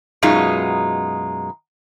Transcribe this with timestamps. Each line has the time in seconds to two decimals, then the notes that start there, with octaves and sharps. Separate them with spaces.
0.23 F#2 B2 G#3 D#4 F4